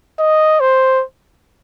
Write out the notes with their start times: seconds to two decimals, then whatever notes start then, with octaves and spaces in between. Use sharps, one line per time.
0.19 D#5
0.60 C5